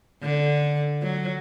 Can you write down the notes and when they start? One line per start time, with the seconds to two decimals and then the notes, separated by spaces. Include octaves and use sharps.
0.22 D3
1.02 F#3